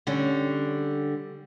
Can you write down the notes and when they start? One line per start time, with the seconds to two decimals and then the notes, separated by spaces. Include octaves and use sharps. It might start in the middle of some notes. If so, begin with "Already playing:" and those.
0.07 D3 G3 C#4